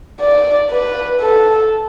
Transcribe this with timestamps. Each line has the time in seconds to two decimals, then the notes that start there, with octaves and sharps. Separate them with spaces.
0.20 D5
0.70 B4
1.20 A4